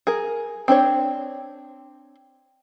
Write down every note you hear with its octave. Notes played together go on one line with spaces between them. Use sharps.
G#4 A#4
C4 D4 C5 C#5